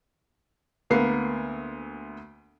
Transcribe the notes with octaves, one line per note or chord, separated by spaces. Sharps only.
D2 A#3 B3 C7